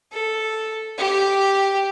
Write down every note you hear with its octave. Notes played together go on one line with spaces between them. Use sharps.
A4
G4